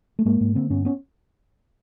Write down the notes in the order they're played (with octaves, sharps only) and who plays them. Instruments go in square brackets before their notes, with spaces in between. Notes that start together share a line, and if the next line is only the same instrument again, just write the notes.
[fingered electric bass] A3
G#2 G#3 A#3
G#2
D3 A#3 C4
G2 B3 C#4
B3 C#4